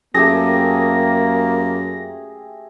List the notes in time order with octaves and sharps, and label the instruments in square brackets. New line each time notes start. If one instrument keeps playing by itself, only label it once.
[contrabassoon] F#2 [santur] A3 G4 G#4 [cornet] A#3 [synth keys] A#6